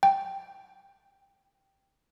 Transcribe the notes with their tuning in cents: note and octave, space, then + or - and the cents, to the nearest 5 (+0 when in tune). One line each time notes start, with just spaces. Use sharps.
G5 +0